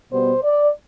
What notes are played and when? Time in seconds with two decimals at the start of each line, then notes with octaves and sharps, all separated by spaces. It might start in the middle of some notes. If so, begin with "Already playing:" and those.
0.12 B2 G3 B3 C5
0.43 D5